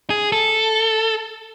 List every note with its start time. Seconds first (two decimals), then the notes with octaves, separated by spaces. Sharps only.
0.10 G#4
0.32 A4